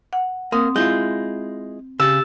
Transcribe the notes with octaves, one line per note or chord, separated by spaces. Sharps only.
F#5
A#3 C4 D#6
G#3 E4 F4 G6
C#3 G4 E6 A6